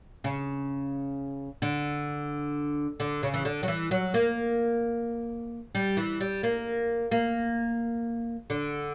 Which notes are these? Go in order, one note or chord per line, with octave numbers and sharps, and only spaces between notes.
C#3
D3
D3
C#3
E3
D3
F#3
E3
F#3
A#3
G3
E3
G3
A#3
A#3
D3